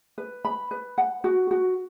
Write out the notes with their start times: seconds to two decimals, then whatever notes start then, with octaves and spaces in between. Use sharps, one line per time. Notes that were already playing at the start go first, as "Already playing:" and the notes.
0.18 B4
0.45 B5
0.71 B4
0.98 F#5
1.24 F#4
1.51 F#4